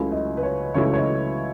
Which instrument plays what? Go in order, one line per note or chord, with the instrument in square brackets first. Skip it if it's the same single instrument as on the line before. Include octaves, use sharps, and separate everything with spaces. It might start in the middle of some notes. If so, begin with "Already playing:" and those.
Already playing: [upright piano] C#2 C#3 F#3 A3 E4
D#5
B4
C#5
C#2 C#3 F#3 A3 E4 C#5
C#5
D#5